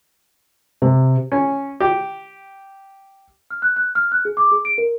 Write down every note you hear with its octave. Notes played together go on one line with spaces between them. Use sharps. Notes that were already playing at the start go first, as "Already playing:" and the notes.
C3
C#4
G4
F6
F#6
F#6
F6
F#6
G#4
D6
G#4
D7
A#4